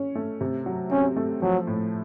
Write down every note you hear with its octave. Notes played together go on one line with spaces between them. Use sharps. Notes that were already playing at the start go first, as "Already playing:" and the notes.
Already playing: C#4
A3
C3
F#3
C4 C#4
A3
F3 F#3
A2